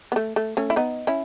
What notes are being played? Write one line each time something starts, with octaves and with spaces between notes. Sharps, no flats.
B3
A3
A3
A3 C#4
E4
B3 D#4
C#4 E4